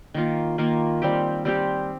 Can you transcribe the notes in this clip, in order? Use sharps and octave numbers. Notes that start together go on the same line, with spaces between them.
D#3 A#3 F4
D#3 A#3 F4
G3 C4 G4
G3 C4 G4